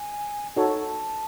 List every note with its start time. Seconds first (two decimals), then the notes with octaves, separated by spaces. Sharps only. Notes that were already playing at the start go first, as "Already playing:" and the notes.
Already playing: G#5
0.56 D#4 F#4 A4 C#5 A5